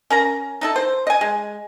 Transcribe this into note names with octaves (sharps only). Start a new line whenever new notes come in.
C#4 A#4 A#5
D#4 E4 A4
C5
D#5 G#5
G#3